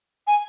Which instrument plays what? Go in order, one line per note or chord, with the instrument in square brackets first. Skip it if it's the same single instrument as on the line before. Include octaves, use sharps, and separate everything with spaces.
[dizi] G#5